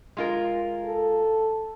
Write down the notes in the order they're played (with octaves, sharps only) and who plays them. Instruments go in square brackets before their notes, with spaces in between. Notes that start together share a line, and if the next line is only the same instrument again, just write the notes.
[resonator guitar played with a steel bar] G#3 F4 A#4
[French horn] A4